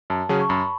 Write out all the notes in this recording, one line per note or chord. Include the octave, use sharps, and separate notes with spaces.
F#2 A5
C#3 F#3 C#4 G#4 A5
C#6
F#2 B5